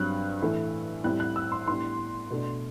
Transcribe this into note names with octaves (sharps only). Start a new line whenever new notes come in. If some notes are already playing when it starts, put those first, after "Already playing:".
Already playing: G2 F#3 C4 F#6
A2 E3 A3 E4
A2 G3 C4 E4 F#6
F#6
E6
C6
A2 G3 B3 D4 C6
B2 A3 D4